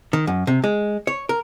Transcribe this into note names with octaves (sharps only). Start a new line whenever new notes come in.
D#3
F#2
C3
G#3
C#5
A#4